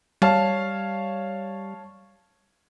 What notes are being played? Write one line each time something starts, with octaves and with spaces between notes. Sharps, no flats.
G3 C#5 F5 A5